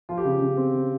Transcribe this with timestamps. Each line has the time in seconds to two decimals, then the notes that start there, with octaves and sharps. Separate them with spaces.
0.09 F3 F4
0.18 G4
0.25 C#3
0.41 C#3
0.57 C4
0.74 C#3